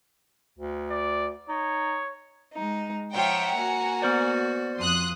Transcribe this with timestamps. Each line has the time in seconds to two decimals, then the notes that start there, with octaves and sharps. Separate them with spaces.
0.59 D2
0.90 D5
1.49 D#4 C#5
2.54 G#3 D#4
3.13 F3 F4 C#5 E5 F#5 G5 A#5
3.56 A#3 F#4 G#5
4.02 B3 C5 D5
4.77 F2 C6 D#6 F#6